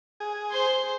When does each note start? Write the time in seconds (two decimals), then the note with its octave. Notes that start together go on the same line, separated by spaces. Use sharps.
0.20 G#4
0.51 C5 C6